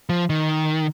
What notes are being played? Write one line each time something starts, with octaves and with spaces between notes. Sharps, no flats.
F3
D#3